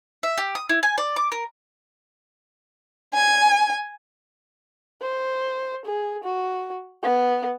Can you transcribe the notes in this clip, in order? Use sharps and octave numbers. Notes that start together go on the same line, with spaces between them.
E5
G4
D#6
E4
G#5
D5
D6
A#4
G#5
C5
G#4
F#4
B3